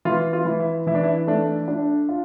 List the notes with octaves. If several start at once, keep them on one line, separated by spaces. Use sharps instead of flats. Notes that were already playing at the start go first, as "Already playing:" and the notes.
E3 F4
F4
E3
E4
E3 E4
D4
E4
A3 D4
D4
F4